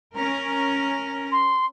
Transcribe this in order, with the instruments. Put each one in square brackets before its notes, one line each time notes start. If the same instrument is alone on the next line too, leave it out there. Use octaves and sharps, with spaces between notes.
[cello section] C#4 A#4
[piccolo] C6